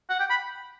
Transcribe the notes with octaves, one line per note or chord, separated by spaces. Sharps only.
F#5
G5
B5